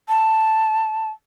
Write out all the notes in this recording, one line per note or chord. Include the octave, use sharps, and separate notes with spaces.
A5